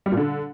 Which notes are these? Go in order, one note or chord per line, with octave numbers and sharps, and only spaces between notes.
G3
A#2
D3